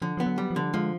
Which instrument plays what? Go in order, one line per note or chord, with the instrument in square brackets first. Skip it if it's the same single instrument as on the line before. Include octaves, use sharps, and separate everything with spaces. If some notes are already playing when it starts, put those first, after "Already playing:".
[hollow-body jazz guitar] D3 [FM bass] F3
[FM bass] F3 [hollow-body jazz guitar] B3
[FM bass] F#3
[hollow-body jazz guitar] G3
[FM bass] F3
[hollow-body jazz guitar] D3
[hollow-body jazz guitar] F3 [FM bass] G#3